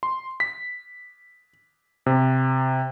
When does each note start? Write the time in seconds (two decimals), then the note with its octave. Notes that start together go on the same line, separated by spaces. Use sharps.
0.03 C6
0.40 B6
2.06 C3